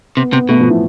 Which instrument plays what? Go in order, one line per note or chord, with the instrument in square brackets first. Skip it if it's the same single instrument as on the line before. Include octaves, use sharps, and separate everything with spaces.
[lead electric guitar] C3 [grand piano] B3
[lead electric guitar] C3 [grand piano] B3
[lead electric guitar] B2 [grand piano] A3
[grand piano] F3
E3